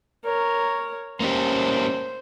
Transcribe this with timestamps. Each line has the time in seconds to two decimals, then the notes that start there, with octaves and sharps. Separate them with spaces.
0.25 A#4 C#5
1.20 A#3 C#4 G4 C5